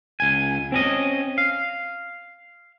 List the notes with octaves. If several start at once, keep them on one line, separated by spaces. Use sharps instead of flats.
C#2 G#5
C4 C#4 D#5
F5